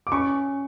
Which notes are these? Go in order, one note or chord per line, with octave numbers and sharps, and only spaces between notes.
D6
C#4 C#6